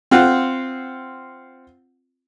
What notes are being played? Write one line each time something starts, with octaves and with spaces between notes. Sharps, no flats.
C4 F4 F#5